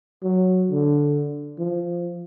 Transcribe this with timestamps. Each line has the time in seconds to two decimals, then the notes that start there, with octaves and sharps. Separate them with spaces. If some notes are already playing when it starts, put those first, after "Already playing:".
0.23 F#3
0.71 D3
1.59 F3